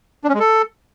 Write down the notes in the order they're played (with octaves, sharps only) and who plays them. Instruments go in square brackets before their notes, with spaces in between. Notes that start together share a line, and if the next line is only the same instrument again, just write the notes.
[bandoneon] D4
C#4
G#3
A4